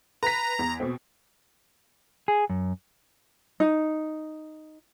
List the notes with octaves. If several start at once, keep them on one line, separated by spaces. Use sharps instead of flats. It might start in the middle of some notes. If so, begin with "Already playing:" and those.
B4 A#5 B6
E2
B2 C4
G#4
F#2
D#4